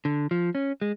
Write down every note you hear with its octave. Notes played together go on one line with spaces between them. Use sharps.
D3
F3
C#4
G#3